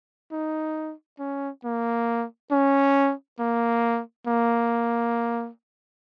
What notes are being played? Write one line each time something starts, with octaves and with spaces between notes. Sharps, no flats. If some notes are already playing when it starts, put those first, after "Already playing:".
D#4
C#4
A#3
C#4
A#3
A#3